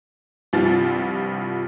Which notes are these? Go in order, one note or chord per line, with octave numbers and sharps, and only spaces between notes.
C2 G2 F3 C4 A6